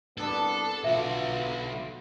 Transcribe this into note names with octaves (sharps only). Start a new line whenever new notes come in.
C2 B3 D4 A4
B1 D3 B3 F4 F#4 E5